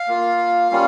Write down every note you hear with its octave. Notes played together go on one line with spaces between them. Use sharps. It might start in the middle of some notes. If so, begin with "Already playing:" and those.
Already playing: F5
A#3 F4
G3 A#3 C#4 F4